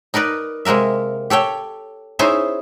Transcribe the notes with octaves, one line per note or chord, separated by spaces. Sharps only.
D#4 A#4 B4 D5
C3 G#3 A#3 A#4 E5
G4 A4 C#5 G5
C#4 D#4 E4 G#4 C5 E5